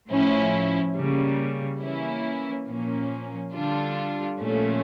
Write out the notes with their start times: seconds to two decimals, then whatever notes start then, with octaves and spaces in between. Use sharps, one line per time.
0.08 A2 F3 C#4 E4
0.95 C#3 G3 A#3
1.81 E3 A#3 C#4 E4
2.67 A#2 F3 A#3 C#4
3.54 D3 G3 D4 F4
4.39 A#2 F3 A3 C#4